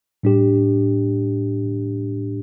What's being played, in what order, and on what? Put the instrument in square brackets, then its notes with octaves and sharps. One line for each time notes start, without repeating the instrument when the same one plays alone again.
[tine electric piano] A2 G3 D4 G4